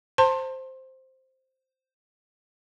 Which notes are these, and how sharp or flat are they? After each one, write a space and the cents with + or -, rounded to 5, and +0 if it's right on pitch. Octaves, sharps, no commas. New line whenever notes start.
C5 +0 A5 +35 C6 +20